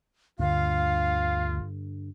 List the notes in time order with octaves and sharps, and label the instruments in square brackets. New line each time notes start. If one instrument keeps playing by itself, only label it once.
[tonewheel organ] D2 [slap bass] G2 D3 [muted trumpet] F4 [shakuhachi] F5